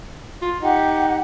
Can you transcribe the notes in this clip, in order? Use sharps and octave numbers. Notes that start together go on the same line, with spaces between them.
F4
D#4 G4 F#5